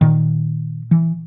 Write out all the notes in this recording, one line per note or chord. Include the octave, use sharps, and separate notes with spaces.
A#2 D#3
E3